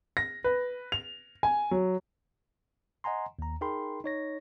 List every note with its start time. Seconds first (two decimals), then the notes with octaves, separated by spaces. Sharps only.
0.17 A#6
0.44 B4
0.92 F7
1.43 G#5
1.71 F#3
3.04 D#5 F#5 G#5 A#5 C6
3.39 D#2 A#5
3.61 D#4 G#4 A#4 G5 B5 C6
4.04 D#4 C#5 A#6